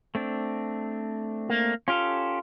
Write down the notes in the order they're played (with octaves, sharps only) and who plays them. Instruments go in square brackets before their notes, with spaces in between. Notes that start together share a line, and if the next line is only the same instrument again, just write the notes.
[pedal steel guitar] A3 C4 D4
[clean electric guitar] A#3
[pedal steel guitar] C#4 G4 A4 [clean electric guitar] F4